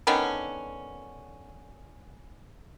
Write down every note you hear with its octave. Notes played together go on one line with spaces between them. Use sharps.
D3 D#3 B3 C#4